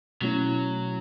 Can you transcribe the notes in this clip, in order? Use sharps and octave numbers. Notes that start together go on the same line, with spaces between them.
B2 F#3 A3 C#4 E4